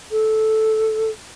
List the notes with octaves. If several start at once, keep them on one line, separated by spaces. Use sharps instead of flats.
A4